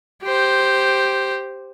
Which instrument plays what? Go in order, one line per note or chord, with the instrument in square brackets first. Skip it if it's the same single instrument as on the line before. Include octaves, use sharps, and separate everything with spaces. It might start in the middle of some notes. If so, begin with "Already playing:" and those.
[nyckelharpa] G4 C5